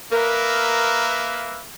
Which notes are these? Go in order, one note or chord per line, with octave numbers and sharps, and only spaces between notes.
A#3 A#4 B4 E5